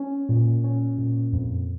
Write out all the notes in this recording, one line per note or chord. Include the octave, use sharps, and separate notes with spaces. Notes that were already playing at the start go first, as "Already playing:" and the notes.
Already playing: C#4
A#2
C#4
A#2
F2